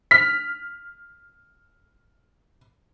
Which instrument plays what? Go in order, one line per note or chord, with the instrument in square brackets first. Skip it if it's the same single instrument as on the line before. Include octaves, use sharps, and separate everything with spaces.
[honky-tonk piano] F6 B6